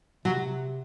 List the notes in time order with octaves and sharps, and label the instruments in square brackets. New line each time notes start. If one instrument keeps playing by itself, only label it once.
[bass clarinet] C3 [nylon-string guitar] F#3